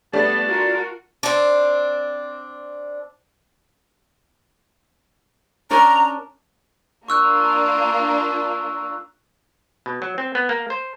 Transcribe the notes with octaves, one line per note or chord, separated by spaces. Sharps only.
G3 A3 B3 D4 A5
F4 F#4 A#4
C4 D4
C#4 D4 A#4 A#5
A#3 D4 F4 C#6 E6 F#6
B2
F#3
C4
B3
A#3
C5